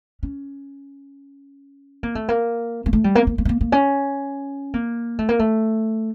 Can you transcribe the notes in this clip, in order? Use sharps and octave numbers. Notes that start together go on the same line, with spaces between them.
C#4
A#3
A3
A#3
A#3
A3
G3
A#3
A#3
A#3
A3
A#3
A#3
C#4
A#3
A3
A#3
A3